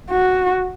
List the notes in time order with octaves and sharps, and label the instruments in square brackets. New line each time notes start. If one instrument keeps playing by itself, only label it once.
[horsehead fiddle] F#4